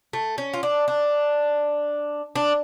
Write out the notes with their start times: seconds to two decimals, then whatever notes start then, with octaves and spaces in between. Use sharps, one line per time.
0.13 A3
0.38 C#4
0.54 F4
0.63 D4
0.88 D4
2.35 D4